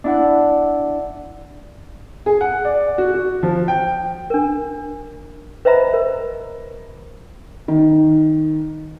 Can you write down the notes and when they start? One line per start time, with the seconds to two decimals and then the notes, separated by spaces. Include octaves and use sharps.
0.04 D4 E4 F#5
2.26 G#4
2.41 F#5
2.65 D5
2.98 F#4
3.14 F#4
3.43 F3
3.68 G5
4.30 D4 A#4
5.65 B4 C5 D#5 E5 A#5 B5
5.94 A#4
7.68 D#3